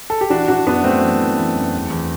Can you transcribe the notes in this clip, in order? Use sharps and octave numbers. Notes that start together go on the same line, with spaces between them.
A4
G4
E3 D4 F#4
E3 D4 F#4
F#2 B3 D4
F#2 A3 C4
E3
E3
E3
F#2
E2
E2